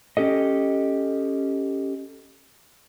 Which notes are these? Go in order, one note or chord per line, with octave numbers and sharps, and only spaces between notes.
C#4 G4 A4 D#5